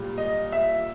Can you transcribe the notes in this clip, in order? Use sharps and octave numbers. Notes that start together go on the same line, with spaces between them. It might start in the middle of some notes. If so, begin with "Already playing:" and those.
Already playing: A#2 G3
D#5
E5